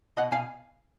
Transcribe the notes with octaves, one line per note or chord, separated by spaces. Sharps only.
B2 D#5 F#5
B2 F5 G#5